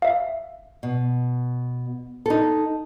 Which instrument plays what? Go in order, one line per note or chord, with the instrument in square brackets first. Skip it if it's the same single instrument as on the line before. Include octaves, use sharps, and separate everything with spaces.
[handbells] E5 F5
[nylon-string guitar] B2
D#4 A4